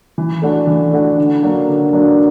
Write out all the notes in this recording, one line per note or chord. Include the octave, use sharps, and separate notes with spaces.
E3
A3 D4 F#4
E3
A3 D4 F#4
D3
F#3 A#3 D4
D3
F#3 A#3 D4